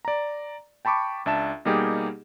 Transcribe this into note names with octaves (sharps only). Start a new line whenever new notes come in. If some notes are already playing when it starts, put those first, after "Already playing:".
D5 A#5
G5 A5 B5 C#6 D6
C#2 D4 E5 A5 E7
B2 G3 A#3 D#4 G4 G#4